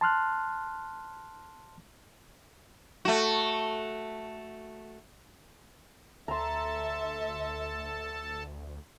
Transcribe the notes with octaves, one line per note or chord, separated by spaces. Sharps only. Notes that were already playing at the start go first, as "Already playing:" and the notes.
A5 C6 F6 F#6
A3 F#4
D2 A4 E5 A5 A#5 C6